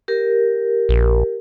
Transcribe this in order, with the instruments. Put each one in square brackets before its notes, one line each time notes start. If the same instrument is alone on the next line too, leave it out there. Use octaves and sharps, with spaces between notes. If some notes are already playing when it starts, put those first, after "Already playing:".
[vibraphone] G4 A#4
[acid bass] A#1